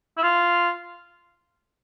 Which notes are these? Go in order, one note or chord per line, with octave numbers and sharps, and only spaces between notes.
E4
F4